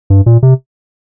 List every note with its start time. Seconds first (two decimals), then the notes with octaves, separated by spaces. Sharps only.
0.10 G2
0.26 A#2
0.43 C3